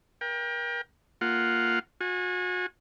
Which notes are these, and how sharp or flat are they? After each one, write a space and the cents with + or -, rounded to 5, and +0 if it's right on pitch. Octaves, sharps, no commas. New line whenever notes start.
A#4 +40 G5 +25
A#3 +0 F4 +0 F#5 +0
F#4 -35 G#5 -10